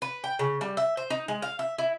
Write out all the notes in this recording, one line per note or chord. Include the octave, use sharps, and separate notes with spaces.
B4
G5
C#3
G3
E5
C5
D#4
G#3
F5
E5
E4